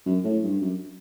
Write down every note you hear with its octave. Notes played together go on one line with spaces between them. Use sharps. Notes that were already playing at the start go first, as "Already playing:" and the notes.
F#2
A2
G2
F#2